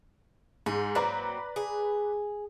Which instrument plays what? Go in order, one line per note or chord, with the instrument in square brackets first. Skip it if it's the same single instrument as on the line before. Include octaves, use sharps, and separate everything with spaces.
[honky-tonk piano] G#2 [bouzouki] G#4
[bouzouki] F#3 A#3 C4 [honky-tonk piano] B4 D5 A#5
[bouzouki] G#4